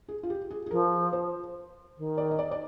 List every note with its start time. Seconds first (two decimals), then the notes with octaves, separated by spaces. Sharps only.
0.08 G#4
0.23 F4
0.30 G4
0.50 G#4
0.66 G#4
0.71 F3 A#4
1.13 C5
1.98 D#3
2.18 D5
2.31 D#5
2.39 D5
2.51 D5